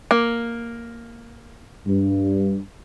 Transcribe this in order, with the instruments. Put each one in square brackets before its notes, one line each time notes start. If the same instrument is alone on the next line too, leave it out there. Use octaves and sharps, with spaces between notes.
[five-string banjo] A#3
[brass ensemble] G2